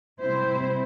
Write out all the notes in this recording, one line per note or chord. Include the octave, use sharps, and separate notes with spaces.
C3 G3 C4 E4 C5